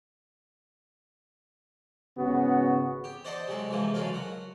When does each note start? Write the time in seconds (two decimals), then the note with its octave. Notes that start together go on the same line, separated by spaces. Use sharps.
2.17 G#1 C#3 B3 F#4
3.04 G4
3.25 C5 D5 D#5 F#5 A5
3.48 C3 F#3 G#3 A4
3.70 G#2 C3 E3 F3 G#3 A#3
3.94 C#3 F#3 G#3 F4 A4 A#4
4.13 F#3 F#5